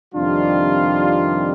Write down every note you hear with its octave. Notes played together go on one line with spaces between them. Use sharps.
F2 C3 D#3 G3 D4 F4